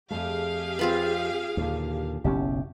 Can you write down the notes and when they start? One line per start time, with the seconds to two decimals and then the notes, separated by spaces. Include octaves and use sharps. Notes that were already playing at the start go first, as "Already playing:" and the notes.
0.11 F2 A3 G4 G#4 F5
0.79 C4 F4 B4
1.57 D#2 A#2 D3
2.24 F#1 B1 C#4 E4 G4